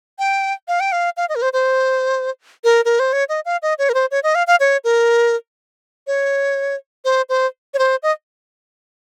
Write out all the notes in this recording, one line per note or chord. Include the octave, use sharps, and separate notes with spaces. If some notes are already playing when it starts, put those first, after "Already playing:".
G5
F5
G5
F5
F5
D#5
A#4
C5
C5
A#4
A#4
C5
C#5
D#5
F5
D#5
C#5
A#4
C5
C#5
D#5
F5
F5
C#5
A#4
C#5
C5
C5
C#5
C5
D#5